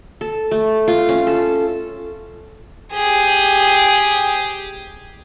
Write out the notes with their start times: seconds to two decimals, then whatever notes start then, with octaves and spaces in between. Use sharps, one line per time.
0.21 A4
0.51 A3
0.88 F4
1.09 C#4
1.27 A4
2.94 G4 G#4